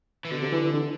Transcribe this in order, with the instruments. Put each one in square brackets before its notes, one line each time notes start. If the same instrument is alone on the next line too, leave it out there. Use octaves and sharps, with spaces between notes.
[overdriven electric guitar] E3
[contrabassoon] B2 [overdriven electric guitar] D3
[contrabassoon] C3
E3
E3
D3